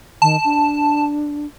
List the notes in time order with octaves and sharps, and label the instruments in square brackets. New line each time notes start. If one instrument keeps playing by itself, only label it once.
[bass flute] D#3 [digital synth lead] A5
[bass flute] D4